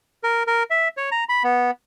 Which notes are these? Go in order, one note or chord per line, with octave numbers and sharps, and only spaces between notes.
A#4
A#4
E5
C#5
A#5
B5
B3